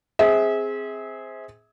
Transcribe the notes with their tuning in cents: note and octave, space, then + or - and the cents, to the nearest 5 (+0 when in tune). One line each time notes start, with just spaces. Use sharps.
C4 +0 G#4 +0 E5 -30